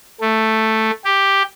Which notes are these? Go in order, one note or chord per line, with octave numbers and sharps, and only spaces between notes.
A3
G4